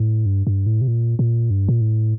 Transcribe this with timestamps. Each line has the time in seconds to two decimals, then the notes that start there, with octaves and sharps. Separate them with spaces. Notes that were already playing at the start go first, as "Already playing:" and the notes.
Already playing: A2
0.26 G2
0.47 G2
0.66 A2
0.81 C3
0.88 A#2
1.19 A#2
1.50 G2
1.68 A#2
1.81 A2